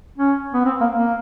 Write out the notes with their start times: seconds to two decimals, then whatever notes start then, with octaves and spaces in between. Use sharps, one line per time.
0.18 C#4
0.53 B3
0.65 C4
0.81 A#3
0.96 A#3